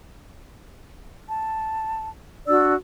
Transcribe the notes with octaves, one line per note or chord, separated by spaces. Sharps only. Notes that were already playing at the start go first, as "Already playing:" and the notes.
A5
D4 F#4 D5 E6